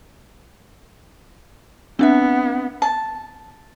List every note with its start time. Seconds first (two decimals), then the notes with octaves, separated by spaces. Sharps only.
1.99 B3 C4 D4 E5
2.82 A5